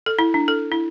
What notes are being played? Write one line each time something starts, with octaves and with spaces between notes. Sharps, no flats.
A4
E4
D4
A4
E4